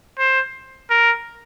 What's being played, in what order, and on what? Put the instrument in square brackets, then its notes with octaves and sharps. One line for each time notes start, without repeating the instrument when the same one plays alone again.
[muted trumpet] C5
A#4